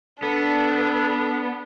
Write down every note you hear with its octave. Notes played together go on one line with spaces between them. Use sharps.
B3 D4 A4